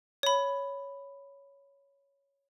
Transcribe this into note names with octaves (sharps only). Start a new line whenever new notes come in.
C#5 B5